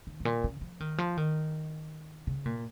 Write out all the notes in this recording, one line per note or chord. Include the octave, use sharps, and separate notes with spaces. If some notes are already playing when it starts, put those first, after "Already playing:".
D#3
G#2
A#2
C#3
F3
D#3
F3
D#3
C#3
A#2